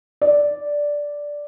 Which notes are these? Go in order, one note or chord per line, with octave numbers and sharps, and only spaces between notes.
D5